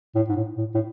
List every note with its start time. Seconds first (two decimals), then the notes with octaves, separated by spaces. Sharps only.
0.15 A2
0.29 G#2
0.36 A2
0.57 A2
0.74 A2